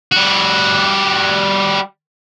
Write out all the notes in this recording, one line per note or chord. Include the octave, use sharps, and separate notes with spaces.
G3 F#4